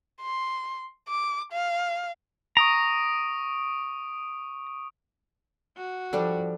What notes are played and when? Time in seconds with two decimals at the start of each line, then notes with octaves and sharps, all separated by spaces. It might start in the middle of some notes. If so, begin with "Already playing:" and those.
0.22 C6
1.08 D6
1.53 F5
2.57 A#5 C#6 D#6 D7
5.77 F#4
6.13 F3 G3 D4 A4